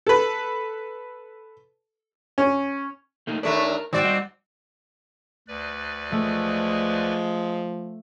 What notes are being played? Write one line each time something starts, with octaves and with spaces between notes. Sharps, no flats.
A4 B4
C#4
A3 A#3 D#4
D#2 A3 D4 A#4 B4
G#2 D#3 C4 F#4 D5
G3 D#5 F#5
D2 B4 D5
F3 G#3 A3